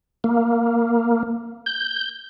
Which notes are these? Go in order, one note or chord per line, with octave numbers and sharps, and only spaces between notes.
A#3
G6